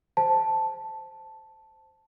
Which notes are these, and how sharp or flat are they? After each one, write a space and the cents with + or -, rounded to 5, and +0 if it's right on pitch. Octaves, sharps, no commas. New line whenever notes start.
G#4 +0 C5 +0 A5 +0